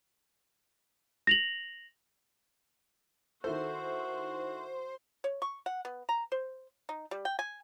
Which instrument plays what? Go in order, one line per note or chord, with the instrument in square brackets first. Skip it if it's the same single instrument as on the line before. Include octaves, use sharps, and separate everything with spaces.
[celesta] A#6 F7 F#7
[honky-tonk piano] D#3 E4 A4 [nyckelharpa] F#4 [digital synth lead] C5
[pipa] C#5
C#6
F#5
B3
A#5
C5
D#4
G3
G5
G#5